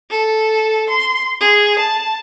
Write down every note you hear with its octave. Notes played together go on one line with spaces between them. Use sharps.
A4
C6
G#4
A5